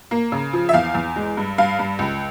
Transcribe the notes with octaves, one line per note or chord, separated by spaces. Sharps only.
A#3
C#3
F3
E5
E2 F5
E2
G#3
G2
G2 F5
G2
C#2